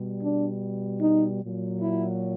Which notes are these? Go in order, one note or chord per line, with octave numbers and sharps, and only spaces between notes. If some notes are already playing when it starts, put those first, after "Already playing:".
Already playing: B2 G3
D4
D#4
A#2 F#3
E4